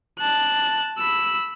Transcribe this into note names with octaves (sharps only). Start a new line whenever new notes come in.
A5 F#6
B5 E6